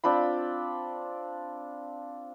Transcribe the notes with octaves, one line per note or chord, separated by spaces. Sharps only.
C4 D4 F4 B5